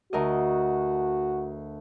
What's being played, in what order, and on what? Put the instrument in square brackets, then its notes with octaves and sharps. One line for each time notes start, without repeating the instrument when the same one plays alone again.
[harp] D2 A#4 D#5 [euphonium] F#4